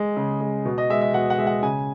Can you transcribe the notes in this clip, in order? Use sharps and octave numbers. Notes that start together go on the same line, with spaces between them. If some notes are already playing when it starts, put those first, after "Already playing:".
Already playing: G#3
C#3
G#3
B2
D#5
G#3 E5
E5
B2 F#5
F#5
G#3 E5
F#5
C#3 G#5